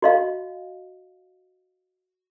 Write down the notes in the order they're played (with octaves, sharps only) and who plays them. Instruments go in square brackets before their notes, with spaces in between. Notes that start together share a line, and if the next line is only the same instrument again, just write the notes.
[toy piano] F#4 D#5 F5